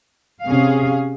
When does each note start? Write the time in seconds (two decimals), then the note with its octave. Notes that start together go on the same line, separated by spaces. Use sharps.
0.43 C3 C#4 G#4 F5